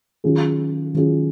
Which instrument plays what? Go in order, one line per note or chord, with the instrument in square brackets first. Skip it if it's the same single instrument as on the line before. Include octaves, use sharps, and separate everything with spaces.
[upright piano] D#3 F#3 C#4 F4 G#4
D#3 F#3 C#4 F4 G#4